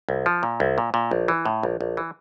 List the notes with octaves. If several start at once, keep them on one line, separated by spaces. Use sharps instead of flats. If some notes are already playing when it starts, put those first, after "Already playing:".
C2
F3
A#2
C2
A#2
A#2
A#1
E3
A2
A#1
A#1
E3